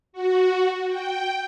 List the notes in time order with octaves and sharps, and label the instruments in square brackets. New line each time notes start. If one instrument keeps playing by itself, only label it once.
[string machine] F#4
G5